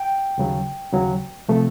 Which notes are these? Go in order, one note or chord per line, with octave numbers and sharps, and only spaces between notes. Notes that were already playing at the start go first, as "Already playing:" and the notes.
Already playing: G5
D#2 C#3 F#3
D#2 C#3 F#3
C3 F3 A3